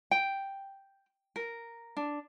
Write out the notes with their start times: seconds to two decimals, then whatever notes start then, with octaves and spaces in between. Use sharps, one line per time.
0.11 G5
1.36 A#4
1.97 D4